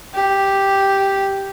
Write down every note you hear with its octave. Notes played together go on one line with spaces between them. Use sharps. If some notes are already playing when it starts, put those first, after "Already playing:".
G4